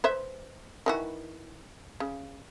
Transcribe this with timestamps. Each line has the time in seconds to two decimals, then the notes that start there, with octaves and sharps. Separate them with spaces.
0.04 B4 C5 E5
0.86 D#3 E3 F#4
2.00 C#3